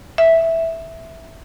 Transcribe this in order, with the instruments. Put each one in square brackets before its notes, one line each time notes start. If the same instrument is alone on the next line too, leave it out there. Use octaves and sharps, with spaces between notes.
[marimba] E5